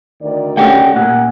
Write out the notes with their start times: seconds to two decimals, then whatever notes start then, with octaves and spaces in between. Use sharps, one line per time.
0.21 D2 D#3 D5
0.57 A3 C#4 G4 F#5 G5
0.96 A#2 F#5